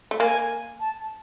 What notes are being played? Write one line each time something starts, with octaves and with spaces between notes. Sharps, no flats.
A3
A#3 G#5
A5